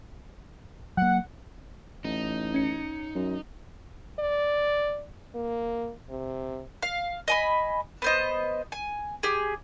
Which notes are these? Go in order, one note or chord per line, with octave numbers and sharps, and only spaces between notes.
F#3 A#3 F#5
A1 D#4
C#4 C#7
F#2
D5
A#3
C3
F5
D#5 G#5 B5
B3 C5 D#5
G#5
G4 G#4